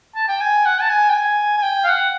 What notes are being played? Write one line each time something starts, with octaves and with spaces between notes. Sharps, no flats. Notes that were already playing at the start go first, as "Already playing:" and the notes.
A5
G5
G#5
F#5
A5
G#5
G5
G#5
G#5
G5
F5
F#5